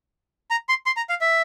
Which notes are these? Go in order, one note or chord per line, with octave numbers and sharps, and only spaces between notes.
A#5
C6
C6
A#5
F5
E5